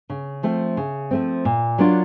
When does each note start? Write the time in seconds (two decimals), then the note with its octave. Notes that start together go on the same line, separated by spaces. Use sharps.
0.10 C#3
0.43 F3 A3 C4
0.77 C#3
1.11 F3 A3 C4
1.45 A#2
1.78 F#3 A#3 D4 F4